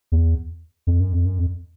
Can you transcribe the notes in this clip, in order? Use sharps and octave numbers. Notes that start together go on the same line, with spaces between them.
E2
F2
F#2
F2
F#2
F2